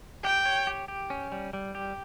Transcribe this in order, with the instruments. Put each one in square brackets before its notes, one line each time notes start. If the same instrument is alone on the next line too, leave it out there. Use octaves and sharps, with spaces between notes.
[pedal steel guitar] G4 [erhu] G5
[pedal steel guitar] C#5
G4
G4
C#4
G3
G3
G4